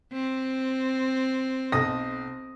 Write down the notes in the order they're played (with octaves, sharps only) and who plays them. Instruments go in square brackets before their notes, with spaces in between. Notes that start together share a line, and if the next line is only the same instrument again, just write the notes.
[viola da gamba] C4
[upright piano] B1 D#6 A#6